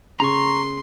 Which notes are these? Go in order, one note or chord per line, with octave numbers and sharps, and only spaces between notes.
C#3 A#5 C6 C#6